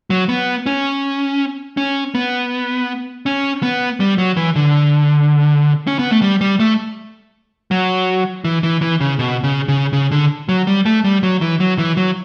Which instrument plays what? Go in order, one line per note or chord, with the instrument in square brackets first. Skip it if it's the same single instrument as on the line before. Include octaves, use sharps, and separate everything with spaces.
[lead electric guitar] F#3
B3
C#4
C#4
B3
C#4
B3
G3
F#3
E3
D3
C#4
B3
A3
G3
G3
A3
F#3
E3
E3
E3
C#3
B2
C#3
C#3
C#3
D3
F#3
G3
A3
G3
F#3
E3
F#3
E3
F#3